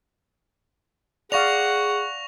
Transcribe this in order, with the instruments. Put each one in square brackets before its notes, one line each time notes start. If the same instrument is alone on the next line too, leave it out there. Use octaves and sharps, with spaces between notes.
[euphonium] G#4 [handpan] D5 F5 [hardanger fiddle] F#5 [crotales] C#6 A#6 F7